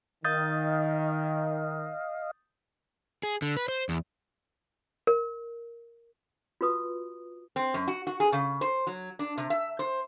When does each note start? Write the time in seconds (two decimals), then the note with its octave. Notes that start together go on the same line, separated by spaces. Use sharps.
0.25 D#3 D#5 F5 D#6 G6 A6
3.23 G#4
3.42 D3
3.57 B4
3.68 C5
3.89 E2
5.07 A#4
6.61 F4 F#4 B4 D#6
7.56 C4
7.74 F#2
7.88 F#4
8.07 F#4
8.20 G#4
8.32 C#3
8.61 C5
8.87 F#3
9.19 D4
9.37 C3
9.50 E5
9.79 C5